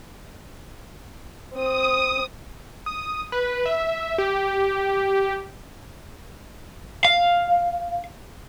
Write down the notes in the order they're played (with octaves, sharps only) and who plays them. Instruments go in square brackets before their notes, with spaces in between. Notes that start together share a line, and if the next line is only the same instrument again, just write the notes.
[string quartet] C4 [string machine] D#6
[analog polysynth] D#6
B4
E5
G4
[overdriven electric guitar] F5